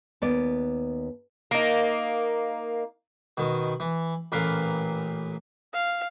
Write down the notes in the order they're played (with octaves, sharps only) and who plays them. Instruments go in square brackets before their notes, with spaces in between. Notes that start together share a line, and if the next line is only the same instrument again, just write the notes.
[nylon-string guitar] D#2 B3 D5
[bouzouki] A#3 D#4
[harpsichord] B2 D#3
E3
A1 A#2 A#4 B4 F5
[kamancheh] F5